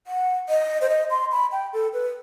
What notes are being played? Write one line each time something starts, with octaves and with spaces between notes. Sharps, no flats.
F#5
D#5
C5
D#5
C6
B5
G5
A4
B4